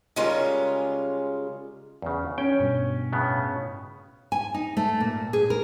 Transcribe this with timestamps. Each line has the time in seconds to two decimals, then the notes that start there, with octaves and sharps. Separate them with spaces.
0.16 C#3 G3 G#3 C#4 F4 A#4
2.02 E2 C#3
2.38 C#4 G5
2.60 G2 B2
3.13 A2 C#3 B3
4.32 G#5
4.54 D#4
4.77 A3
5.00 A#2
5.33 G#4
5.50 A#4